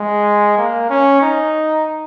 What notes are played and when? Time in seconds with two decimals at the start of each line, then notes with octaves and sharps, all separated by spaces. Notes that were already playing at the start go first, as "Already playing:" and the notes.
Already playing: G#3
0.58 A#3
0.90 C#4
1.22 D#4